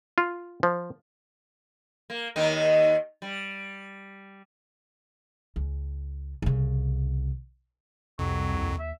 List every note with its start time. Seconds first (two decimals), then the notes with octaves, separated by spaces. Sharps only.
0.18 F4
0.63 F3
2.10 A#3
2.36 D#2 D#3 D#4
3.22 G3
5.56 C#2
6.42 C2 C#3
8.19 C2 F2 C3 F#3
8.54 D#2
8.80 E5